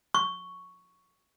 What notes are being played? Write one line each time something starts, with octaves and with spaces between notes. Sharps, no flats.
C#6